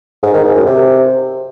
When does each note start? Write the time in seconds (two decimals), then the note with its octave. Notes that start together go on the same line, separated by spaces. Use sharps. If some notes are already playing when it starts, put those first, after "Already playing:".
0.23 G#2
0.34 D#3
0.45 G#2
0.55 F#2
0.66 C3